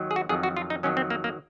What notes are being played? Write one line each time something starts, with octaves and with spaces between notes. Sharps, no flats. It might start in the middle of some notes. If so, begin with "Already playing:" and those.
Already playing: D#2 D#3 F#3
G#4
F#4
F2 D#3 F#3 G#4
F#4
F4
D#4
F2 D#3 F#3 C#4
C4
A#3
A#3